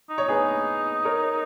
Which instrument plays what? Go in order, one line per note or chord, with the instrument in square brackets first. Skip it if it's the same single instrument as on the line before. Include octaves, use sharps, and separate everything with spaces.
[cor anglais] D#4
[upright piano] C#5
[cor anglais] D#4 [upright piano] G#4 B4
[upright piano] A#4 C#5